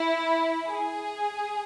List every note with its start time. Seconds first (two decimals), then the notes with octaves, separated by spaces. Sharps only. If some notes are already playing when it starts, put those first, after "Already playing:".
Already playing: E4
0.68 G#4